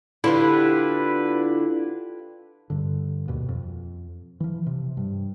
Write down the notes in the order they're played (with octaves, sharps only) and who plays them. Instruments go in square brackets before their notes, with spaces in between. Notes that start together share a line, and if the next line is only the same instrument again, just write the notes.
[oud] D3 [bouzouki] D4 F4 G4 [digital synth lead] E4 [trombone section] B4
[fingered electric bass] G2 D3
D#2 B2
F2
E3 F3
C3
G2